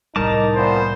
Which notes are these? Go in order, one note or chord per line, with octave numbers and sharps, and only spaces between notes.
C2 A2 G3 D#4 A#4 A5 D6
A#2 E3 B3 C5